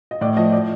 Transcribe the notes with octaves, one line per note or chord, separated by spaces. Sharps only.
D#5
A2 D5
F3 D#5
D5